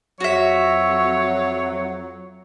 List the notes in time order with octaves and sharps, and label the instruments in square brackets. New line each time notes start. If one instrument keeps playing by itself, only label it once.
[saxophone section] F2 F#3 [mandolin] F#4 E5 [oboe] C#5